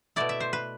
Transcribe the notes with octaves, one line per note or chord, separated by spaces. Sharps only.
B2 A3 E4 D5
E5
C5
B4